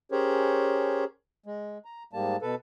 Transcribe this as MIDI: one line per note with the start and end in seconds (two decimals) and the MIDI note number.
0.12 1.04 61
0.12 1.04 67
0.12 1.04 68
0.12 1.04 70
0.12 1.04 72
0.12 1.04 73
1.46 1.78 56
1.85 2.03 82
2.13 2.36 44
2.13 2.36 55
2.13 2.36 58
2.13 2.36 81
2.42 2.55 47
2.42 2.55 69
2.42 2.55 71